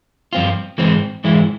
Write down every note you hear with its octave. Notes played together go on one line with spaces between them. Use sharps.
G2 F3 C4 F4
G#2 E3 G#3 C4
G#2 E3 G#3 E4